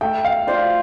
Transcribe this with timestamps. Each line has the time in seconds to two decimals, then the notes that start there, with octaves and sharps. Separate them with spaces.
0.01 A3 G5
0.24 F5
0.47 F4 C5 D5